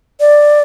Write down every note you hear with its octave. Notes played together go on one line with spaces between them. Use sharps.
D5